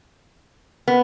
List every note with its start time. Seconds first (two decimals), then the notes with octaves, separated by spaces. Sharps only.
0.88 B3